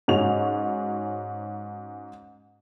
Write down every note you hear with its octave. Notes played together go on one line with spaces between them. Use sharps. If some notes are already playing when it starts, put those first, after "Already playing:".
G#2 C#4 F#4 F7